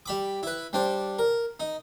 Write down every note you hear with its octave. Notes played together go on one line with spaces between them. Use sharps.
G3 B5 D6
E4 B4
G3 D4 C5
A#4
D#4